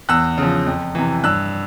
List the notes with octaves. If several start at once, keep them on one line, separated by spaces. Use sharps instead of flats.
E2 E6 F#6
C#3 F3
F2
C3 E3
G2 E6 F#6